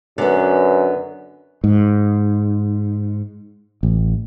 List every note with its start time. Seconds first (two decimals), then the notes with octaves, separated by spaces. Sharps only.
0.18 F#2 D3 B3
1.64 G#2
3.83 A1